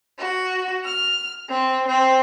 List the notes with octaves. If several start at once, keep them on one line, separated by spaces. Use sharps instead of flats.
F#4
F6
C4
C4